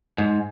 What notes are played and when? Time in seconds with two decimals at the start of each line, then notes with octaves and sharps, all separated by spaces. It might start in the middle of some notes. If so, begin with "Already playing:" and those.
0.18 G#2